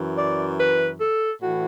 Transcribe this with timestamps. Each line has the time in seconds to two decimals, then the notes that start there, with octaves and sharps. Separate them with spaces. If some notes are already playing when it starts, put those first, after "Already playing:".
Already playing: F#2 E3
0.16 D5
0.57 B4
0.99 A4
1.41 A2 E3 F#4